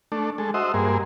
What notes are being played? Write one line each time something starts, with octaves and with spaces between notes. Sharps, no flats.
A3 D4
G#3 A4
F#4 C5 D#5 E5
G2 A#3 G#4 C5